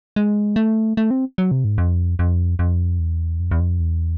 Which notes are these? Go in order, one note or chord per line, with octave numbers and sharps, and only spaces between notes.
G#3
A3
A3
C4
F#3
C3
G#2
F2
F2
F2
E2
F2
E2
F2
E2